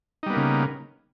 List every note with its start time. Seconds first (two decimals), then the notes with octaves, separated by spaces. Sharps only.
0.23 D#4
0.26 G3
0.30 B3
0.33 A#3
0.37 C#3